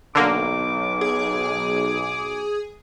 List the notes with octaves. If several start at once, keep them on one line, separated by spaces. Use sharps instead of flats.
B1 D3 A#3 D6
G#4